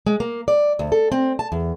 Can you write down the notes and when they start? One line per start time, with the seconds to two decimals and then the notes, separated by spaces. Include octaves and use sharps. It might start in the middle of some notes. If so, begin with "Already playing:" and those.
0.06 G#3
0.20 A#3
0.48 D5
0.79 D2
0.92 A4
1.12 C4
1.39 A5
1.52 E2